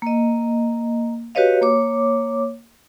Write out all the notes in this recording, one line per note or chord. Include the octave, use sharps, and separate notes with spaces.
A#3 D#5
F#4 G4 B4 C#5 D#5 F5
A#3 C#5 D6